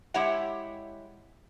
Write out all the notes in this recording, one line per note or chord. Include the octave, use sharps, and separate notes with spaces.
G#3 E4 G4 C#5 E5 F#5